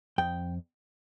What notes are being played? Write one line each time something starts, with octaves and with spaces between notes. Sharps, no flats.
F2 G5